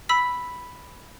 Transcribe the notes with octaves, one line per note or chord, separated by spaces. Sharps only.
B5 E6 B6